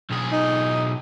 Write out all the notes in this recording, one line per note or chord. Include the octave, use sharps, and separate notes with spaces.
B1 G#4
D#4